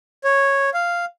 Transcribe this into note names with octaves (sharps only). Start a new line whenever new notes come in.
C#5
F5